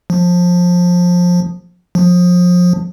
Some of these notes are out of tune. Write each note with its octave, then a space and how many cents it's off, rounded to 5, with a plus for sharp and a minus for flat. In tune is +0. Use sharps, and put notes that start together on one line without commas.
F3 +20
F3 +30